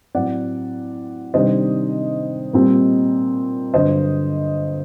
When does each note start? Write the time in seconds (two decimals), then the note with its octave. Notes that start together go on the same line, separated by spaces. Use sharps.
0.15 A2 F#3 C4 D5 F#5
1.34 C3 D#3 G3 D4 C5 D#5
2.53 A#2 G3 C4
3.74 G2 D3 F#3 C5 D#5